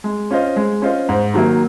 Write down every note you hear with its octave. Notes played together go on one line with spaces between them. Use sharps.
G#3
C#4 F4 C5 D#5
G#3
C#4 F4 C5 D#5
G#2
D#3 F#3 A#3